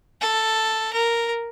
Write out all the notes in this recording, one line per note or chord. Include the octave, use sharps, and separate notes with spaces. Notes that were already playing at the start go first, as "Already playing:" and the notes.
A4
A#4